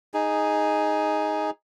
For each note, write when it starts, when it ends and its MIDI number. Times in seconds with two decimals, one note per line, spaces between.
0.14 1.50 63
0.14 1.50 68